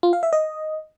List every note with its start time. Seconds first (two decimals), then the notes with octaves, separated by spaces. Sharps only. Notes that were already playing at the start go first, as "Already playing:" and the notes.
0.03 F4
0.13 F5
0.23 E5
0.33 D#5